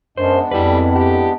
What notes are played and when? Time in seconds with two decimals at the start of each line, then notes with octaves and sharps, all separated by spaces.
0.17 F#2 G#3 B3 D4 C5
0.51 F2 G3 E4 B4
0.95 G4